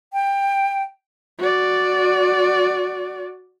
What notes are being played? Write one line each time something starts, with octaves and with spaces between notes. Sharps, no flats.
G5
F#4 D5